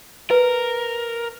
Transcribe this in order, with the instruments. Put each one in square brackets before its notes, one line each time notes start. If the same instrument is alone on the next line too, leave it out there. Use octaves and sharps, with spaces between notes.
[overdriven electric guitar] A#4 [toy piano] B4